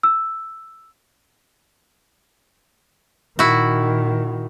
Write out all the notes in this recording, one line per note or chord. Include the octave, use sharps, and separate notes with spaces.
E6
A#2 D#3 E4 F#4